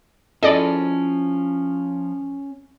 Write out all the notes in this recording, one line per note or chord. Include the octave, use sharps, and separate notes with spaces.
F3 C#4 E4 G#4 A4 D5 D#5